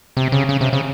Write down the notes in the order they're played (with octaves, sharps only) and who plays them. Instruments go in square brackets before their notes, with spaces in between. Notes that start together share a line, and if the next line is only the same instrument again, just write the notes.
[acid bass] C3
C#3
C#3
C3
C#3